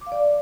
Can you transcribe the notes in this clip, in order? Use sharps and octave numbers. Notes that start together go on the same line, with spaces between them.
D6
F5
D5